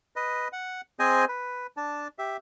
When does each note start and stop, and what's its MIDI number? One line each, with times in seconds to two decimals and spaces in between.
0.16 0.48 71
0.16 0.48 75
0.53 0.81 78
0.99 1.25 60
0.99 1.25 68
0.99 1.25 72
0.99 1.25 75
0.99 1.25 80
1.29 1.67 71
1.77 2.08 62
1.77 2.08 81
2.19 2.37 67
2.19 2.37 76